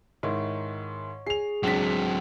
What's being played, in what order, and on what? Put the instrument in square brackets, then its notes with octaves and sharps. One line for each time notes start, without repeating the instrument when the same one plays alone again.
[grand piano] G#2 D#3 E4 [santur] C#5
[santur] G#4 [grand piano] C7 F7
[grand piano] C#2 D4 B6 [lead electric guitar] F#3 C4